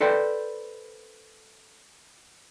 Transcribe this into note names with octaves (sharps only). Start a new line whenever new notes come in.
A4 B4 C5 D5 G5